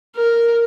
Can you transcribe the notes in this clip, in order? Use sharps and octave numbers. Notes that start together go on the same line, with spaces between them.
A#4